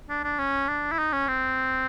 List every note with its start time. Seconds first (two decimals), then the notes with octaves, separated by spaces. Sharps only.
0.09 D4
0.24 D4
0.39 C#4
0.68 D4
0.92 E4
0.99 D#4
1.13 C#4
1.28 C4